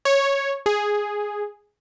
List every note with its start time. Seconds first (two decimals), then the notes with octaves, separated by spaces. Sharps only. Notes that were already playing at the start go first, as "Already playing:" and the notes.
0.05 C#5
0.66 G#4